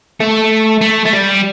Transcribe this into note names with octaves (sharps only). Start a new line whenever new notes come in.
A3
A3
A3
G3